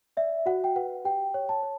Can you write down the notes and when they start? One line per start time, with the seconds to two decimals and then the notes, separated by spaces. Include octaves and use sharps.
0.17 D5 E5
0.46 F#4 F#5
0.64 G5
0.76 B4 F#5
1.05 G4 G5
1.34 C#5
1.49 A5
1.63 C#5